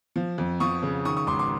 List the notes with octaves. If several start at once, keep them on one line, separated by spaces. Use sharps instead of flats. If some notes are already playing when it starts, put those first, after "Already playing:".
F3
F2
F3 C#6 D#6
C#3
D#3 C#6 D#6
C#6 D#6
G#1 C6 D6
C6 D6